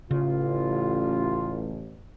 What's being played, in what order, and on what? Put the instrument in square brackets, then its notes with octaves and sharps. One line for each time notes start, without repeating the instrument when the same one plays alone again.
[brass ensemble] A1 [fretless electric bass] C#3 [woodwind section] F4